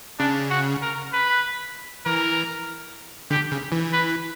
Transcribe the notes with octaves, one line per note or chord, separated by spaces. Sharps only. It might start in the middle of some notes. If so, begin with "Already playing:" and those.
C#3 D4
F#4
A#4
B4
E3 A#4
D3 G4
C#3
E3
B4